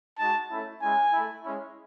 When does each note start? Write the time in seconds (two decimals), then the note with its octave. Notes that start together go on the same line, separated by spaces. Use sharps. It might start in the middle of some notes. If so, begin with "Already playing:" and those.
0.19 G#3 D#4 F#4 A5
0.50 A3 C#4 E4
0.81 G#3 C#4 E4 G#5
1.12 A3 E4
1.43 G#3 C#4 E4